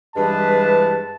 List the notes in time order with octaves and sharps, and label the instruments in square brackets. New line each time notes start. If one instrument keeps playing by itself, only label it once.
[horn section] G2 E3 G#3 [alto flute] B4 [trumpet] A5